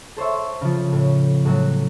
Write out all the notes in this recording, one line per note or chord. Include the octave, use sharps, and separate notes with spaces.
A4 C5 C#5 E5
C#3 F3
A2
A2 F#3 F#4